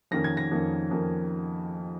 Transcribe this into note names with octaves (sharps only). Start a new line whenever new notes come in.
F2 D#3 A#3 C#4 A#6
G#6
A#6
F2 D#3 A#3 C#4
F2 D#3 A#3 C#4